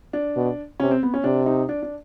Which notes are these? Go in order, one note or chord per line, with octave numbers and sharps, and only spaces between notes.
D4
B2
C3 C#4
C4
B3
C#4
C3 D4
D#4
D4
D4